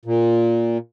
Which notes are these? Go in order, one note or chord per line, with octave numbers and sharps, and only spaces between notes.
A#2